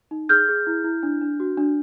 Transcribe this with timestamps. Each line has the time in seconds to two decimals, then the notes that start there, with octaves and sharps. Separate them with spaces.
0.11 D#4
0.29 G#4 F6 G6
0.48 G#4
0.67 E4
0.84 E4
1.03 D4
1.21 D4
1.40 F#4
1.58 D4